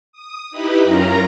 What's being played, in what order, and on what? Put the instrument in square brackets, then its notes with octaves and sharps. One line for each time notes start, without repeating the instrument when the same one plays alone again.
[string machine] D#6
D#4 E4 G4 B4 B5
F#2 C#4 F4 A#4 A#5 A#6